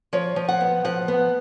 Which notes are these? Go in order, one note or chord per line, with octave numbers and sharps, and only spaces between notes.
F3 C#5
F3
F#5
B3
F3 F#5
B3